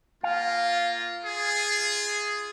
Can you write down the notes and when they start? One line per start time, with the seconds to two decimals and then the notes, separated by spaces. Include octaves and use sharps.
0.23 A#3 F4 F5
1.23 F4 G#4